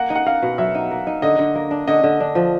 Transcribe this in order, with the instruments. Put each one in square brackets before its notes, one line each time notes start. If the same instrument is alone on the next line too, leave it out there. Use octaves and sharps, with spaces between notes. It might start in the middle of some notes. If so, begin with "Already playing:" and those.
Already playing: [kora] A#3 [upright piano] F#5
[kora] D#4
[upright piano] F#5
[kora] A#3 [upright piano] F5
[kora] B2
[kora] F#3 [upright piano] E5
[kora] D#4
A#3
D#4
[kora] D3 [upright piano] D#5
[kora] D3
A#3
D4
[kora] D3 [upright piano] D#5
[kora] D3
D4
F3